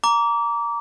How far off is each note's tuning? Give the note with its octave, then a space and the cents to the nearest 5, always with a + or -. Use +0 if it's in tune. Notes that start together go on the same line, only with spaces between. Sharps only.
A#5 +0 D6 -25